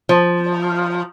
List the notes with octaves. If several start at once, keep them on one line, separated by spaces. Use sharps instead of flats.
F3